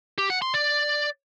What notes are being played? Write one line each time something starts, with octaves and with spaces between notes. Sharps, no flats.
G4
F#5
C6
D5